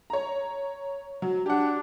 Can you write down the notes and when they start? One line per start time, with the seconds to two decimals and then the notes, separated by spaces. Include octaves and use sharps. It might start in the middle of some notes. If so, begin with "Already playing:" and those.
0.10 C#5 A#5
1.22 F#3
1.46 D4 G4 F#5